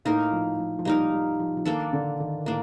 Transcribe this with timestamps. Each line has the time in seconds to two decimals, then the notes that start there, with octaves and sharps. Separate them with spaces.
0.05 A2 A#3 D#4 A#4
0.32 F3
0.59 F3
0.79 F3
0.85 G3 A#3 D#4 A#4
1.12 G3
1.40 F3
1.57 F3
1.65 D#3 A#3 D4 A4
1.93 D3
2.20 D#3
2.46 A2 A#3 D4